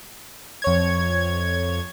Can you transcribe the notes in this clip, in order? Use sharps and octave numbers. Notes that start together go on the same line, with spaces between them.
F2 C#5 G#6